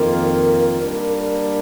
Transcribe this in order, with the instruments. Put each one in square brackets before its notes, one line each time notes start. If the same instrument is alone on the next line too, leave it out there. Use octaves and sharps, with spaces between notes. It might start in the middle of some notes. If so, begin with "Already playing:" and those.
Already playing: [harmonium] F2 D#3 A#3 F4 [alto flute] A#4
[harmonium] G3 A#3 D4
[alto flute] A#4